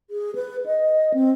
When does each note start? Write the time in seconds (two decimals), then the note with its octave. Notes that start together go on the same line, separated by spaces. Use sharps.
0.10 G#4
0.35 B4
0.66 D#5
1.14 C4